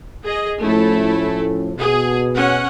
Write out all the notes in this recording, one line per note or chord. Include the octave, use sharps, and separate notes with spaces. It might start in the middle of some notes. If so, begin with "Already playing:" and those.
G#4 D#5
A2 F3 A3 C#4 E4 A4
B2 G#4
C#4 F#5